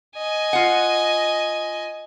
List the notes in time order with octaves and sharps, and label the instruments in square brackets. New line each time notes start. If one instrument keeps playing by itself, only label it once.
[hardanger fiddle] D#5 G#5
[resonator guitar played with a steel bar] F4 F#5